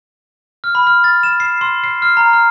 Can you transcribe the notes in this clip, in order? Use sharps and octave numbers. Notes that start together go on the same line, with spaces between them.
F6
B5
F6
A6
E7
C7
C6
C7
F6
A#5
F6